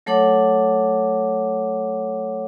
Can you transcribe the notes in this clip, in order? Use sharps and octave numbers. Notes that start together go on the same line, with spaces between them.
F#3 A3 A4 C#5 F#5 D6